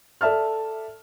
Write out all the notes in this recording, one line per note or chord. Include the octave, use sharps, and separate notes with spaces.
A4 D5 E5 A5 F6